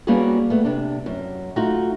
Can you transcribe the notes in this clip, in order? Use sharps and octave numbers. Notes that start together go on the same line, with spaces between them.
G3 A#3 B3 C#4 F#4 G#4
A3 B3
C3 D4
F#2
A3 D#4 F4 F#4